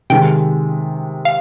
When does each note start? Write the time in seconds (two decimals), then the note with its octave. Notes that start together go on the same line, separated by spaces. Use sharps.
0.10 C3 D#3 G#3 G5
1.25 F5